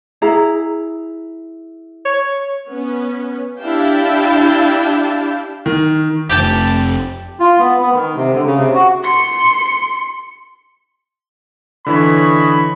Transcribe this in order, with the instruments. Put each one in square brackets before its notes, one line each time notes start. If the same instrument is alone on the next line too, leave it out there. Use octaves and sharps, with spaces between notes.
[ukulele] E4 G#4 A#5
[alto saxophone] C#5
[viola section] B3 C#4
D4 E4 G4 F5 G5 A5
[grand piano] D#3
[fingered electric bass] F1 [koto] G4 G5 A5
[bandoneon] F4
B3
B3
D#3
C3
D3
C#3
C3
F#4
[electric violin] C6 C#7
[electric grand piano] D3 E3 [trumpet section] C#5 D#5 B5